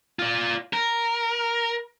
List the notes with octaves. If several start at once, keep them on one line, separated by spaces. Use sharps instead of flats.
F4 D5
A#4